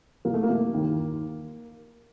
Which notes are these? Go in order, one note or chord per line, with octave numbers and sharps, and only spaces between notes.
C2 A#3
A3
A#3
C2
D#2
D#2